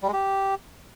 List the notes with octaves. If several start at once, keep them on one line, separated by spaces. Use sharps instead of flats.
G3
G#3
G4